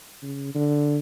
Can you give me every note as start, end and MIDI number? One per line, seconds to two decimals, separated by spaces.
0.22 0.50 49
0.54 0.99 50